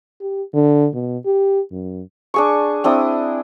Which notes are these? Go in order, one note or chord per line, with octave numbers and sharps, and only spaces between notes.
G4
D3
B2
G4
F#2
D4 G#4 C#6
C4 D4 E4 D#6